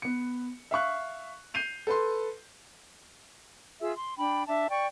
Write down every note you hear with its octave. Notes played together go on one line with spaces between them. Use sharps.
B3 C#7
E5 F5 C#6 F#6
G6 C7 D#7 F7
A4 B4 C6
F4 G#4 E5 E6
C6
D4 G5 B5
D4 E5 A5
D5 G5 C#6